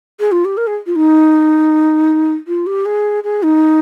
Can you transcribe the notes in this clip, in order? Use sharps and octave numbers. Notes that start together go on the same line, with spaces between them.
G#4
F4
G4
A#4
G#4
F4
D#4
F4
G4
G#4
G#4
D#4